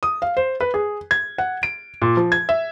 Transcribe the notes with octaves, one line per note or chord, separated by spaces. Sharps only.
D#6
F5
C5
B4
G#4
G#6
F#5
D7
A#2
F3
G#6
E5